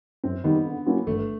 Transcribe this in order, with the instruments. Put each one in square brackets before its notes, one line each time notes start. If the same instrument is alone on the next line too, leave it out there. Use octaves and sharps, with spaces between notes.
[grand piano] F#2 [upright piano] C4
[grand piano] D#3 G3 [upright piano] B3
[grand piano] D3
F#3 A#3 C#4 E4
[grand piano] G1 [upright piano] A3